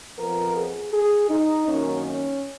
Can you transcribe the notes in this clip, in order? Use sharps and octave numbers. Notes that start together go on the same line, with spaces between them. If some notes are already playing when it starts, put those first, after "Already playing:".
F2 F3 B3 A#4
G#4
G#4
D#4
F#2 D#3 A#3 C#4
C#4